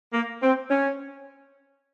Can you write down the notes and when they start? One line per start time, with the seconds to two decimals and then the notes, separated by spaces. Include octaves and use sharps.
0.13 A#3
0.43 C4
0.71 C#4